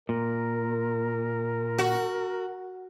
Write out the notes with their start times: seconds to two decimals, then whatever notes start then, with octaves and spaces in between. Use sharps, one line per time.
0.09 A#2 A#4
1.78 F#4